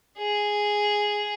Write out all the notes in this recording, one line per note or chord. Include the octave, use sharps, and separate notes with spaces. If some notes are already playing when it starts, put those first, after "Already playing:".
G#4